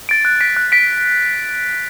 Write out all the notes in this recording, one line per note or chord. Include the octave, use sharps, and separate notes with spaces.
A6 D7
F#6
B6 D7
F#6
B6 D7